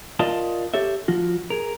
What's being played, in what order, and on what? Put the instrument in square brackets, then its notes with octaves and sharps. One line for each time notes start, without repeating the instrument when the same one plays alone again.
[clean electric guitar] F4 A#4 D5 D#5 F5 A5
G4 A4 C#5 E5
F3 F4 F#4
G#4 A#4